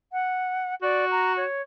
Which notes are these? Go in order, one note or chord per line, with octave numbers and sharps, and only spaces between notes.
F#5
F#4 D5
A#5
C#5